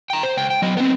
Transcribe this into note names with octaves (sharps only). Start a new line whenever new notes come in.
G5 A#5
C5
C#2 G5
G5
F#3 D#5
B3 C4